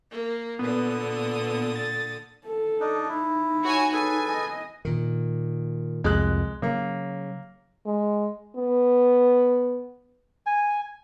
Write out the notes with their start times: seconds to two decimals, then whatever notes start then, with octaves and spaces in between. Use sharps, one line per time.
0.11 A#3
0.59 A#2 D3 B3 D#6
1.75 A6
2.46 A4
2.80 D4 D#4
3.09 D#4 E4
3.64 F#4 C#5 G#5
3.93 G#4 A4 B4 G#5
4.28 D#5
4.85 A#2 D#3
6.04 C2 F2 G#3 F#6
6.62 C#3 F#3 A#3
7.86 G#3
8.56 B3
10.46 G#5